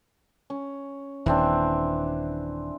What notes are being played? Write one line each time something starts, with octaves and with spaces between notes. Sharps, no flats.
C#4
D#1 D#2 E3 C4 D4